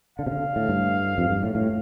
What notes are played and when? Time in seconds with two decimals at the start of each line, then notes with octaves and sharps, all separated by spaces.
0.18 D3 F5
0.26 C3
0.31 D3
0.56 A2
0.69 G2
1.18 F2
1.30 G2
1.43 A2
1.55 A2